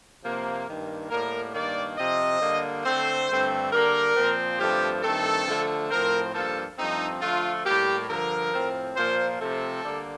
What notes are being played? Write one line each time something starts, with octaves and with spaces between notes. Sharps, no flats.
C3 F3 A#3
G2 D#3 A#3
A2 G3 A#3 A#4
G2 D#3 A#3 D5
C3 F3 C4 D#5
D3 G3 A#3
D3 A3 C4 C5
G2 D3 A3 C4
D3 G3 A#3 A#4
A#2 F3 C4
G2 F3 A3 C4 G4
G2 D#3 A3 C4 A4
D3 F3 A3
A2 F3 C4 A#4
G2 F3 A#3 A4
G2 F3 A3 C4 D#4
D3 F3 A3 F4
A2 G3 A#3 G4
G2 D3 F3 A#4
A2 F3 C4
A#2 F3 A#3 C5
C3 F3 A3 C4 A4
D3 G3 A#3